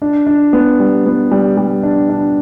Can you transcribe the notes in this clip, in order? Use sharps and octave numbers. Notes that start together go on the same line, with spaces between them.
D4
D4
B3
G3
B3
G3
G3
D4
D4